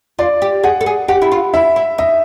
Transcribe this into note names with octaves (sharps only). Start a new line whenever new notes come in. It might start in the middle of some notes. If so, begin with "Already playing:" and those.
F4 D5
G4
G#4 F#5
A4
G#4
G4 F#5
E4
F4
E4 E5
E4
D#4 E5